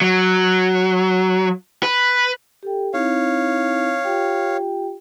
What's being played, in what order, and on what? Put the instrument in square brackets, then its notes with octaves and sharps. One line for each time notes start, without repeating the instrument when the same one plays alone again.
[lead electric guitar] F#3
B4
[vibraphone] G4 A4 G5
[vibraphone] C4 D#4 E4 [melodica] C#5 F5
[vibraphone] F4 G4 G5